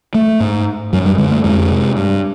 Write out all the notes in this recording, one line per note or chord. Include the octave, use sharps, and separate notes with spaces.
A3
G#2
F#2 F#3
G3
D3 G#3
A3
F2 G#3
C3
G2